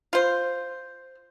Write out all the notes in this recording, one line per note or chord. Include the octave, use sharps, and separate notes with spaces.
F4 C5